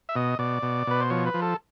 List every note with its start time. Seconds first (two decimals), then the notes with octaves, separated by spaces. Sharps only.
0.09 E5
0.15 B2 D#5
0.39 B2 D5
0.63 B2
0.87 B2 B4
1.00 C5
1.10 F3 C#5
1.26 B4
1.34 F3
1.42 A4